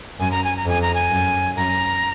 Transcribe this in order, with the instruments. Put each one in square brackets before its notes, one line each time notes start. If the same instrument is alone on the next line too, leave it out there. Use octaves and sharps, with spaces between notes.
[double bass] F#2 [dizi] G#5
[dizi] A#5
G#5
A#5
[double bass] F2 [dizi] G#5
[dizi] A#5
G#5
[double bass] F#2
[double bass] F#2 [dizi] A#5